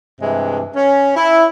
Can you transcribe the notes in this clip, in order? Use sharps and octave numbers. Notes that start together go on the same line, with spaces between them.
G2 C3 E3 G#3
C#4
E4